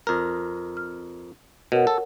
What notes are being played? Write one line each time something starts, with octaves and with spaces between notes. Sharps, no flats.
F2 A#4
F6
B2 A#4 C#5 F#5
A4